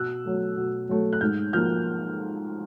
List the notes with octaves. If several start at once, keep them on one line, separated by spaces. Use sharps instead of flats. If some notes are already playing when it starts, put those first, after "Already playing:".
Already playing: B2 E6 F#6
F#3 A3
B2
F#3 A3
F#6
G#2 F6 G6
F3 A#3 F6 G6